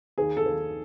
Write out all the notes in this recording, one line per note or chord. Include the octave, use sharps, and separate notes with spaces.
D#2 G#4
A4
D#2